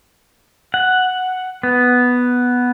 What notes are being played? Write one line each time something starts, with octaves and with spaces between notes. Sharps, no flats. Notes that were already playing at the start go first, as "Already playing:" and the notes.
F#5
B3